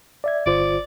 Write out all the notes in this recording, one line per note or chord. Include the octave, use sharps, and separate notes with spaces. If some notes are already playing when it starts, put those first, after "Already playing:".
D5 E5 G#6
G1 F4 C5 D5